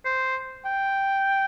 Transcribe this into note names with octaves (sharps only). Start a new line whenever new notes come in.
C5
G5